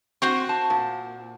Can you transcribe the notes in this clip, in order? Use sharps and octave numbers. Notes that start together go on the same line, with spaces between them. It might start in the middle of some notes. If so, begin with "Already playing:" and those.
C4 F#4 C5 C#6
A5
A#2